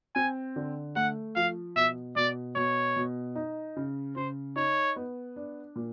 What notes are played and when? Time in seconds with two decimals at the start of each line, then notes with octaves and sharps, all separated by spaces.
0.15 C4 G#5
0.56 D3
0.96 A3 F#5
1.36 F3 F5
1.76 B2 E5
2.16 B2 D5
2.56 B2 C#5
2.96 B2
3.36 D#4
3.76 C#3
4.16 C#3 C5
4.56 D#4 C#5
4.96 B3
5.36 D4
5.76 A#2